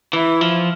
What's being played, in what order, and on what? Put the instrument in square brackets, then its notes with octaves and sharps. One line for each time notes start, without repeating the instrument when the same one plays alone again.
[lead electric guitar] E3 [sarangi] E4
[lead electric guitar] F3